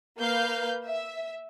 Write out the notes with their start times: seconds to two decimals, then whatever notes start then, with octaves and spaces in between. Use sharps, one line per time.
0.17 A#3 B4 F5 G6
0.85 E5